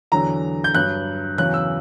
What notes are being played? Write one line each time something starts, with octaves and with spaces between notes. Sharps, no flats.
E2 D3 F#3 A#5
G6
G2 F#3 F#6
E2 C#3 F#3 F#6
E6